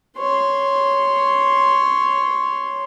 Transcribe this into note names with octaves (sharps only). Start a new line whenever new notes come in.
C#5 C6